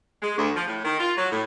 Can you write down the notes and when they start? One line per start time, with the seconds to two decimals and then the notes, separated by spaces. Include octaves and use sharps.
0.22 G#3
0.37 D2
0.56 F3
0.68 A2
0.84 D#3
0.99 F4
1.17 F#3
1.31 A2